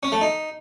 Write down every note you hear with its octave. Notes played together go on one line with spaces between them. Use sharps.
C#4
A3
D#4